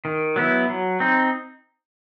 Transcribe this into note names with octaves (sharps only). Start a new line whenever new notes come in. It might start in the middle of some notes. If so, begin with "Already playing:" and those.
D#3
F#3 B3 E4
F#3
C4 D#4